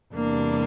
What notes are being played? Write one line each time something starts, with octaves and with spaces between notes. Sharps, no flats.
E2 C3 G3 A#3 D4